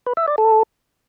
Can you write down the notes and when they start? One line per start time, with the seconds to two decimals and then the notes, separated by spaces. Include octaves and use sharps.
0.06 B4
0.17 E5
0.27 D5
0.38 A4